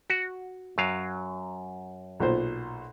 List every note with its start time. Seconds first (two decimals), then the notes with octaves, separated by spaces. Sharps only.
0.10 F#4
0.78 F#2 F#3 F5
2.20 B1 A#2 C5